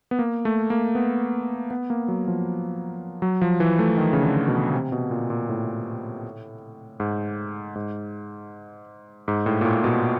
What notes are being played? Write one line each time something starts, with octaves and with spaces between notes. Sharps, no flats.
B3
A#3
A3
A#3
B3
B3
A#3
F#3
F3
F#3
F3
E3
A3
D#3
C#3
D3
B2
C3
B2
A#2
A#2
A2
G#2
G#2
G#2
A2
A#2
A2
B2